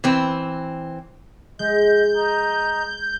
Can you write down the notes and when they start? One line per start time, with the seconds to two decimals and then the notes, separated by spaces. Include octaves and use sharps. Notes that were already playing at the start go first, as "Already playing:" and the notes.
0.04 E3 C4
1.59 G#3 D#5 G6
2.15 D#5 A#5 D#6